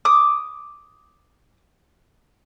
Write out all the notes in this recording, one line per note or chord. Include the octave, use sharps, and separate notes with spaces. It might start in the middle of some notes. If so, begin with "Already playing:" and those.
D6 D#6